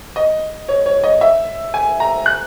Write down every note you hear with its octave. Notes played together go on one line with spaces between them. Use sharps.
D#5
C#5
C#5
D#5
E5
G#5
A#5
F#6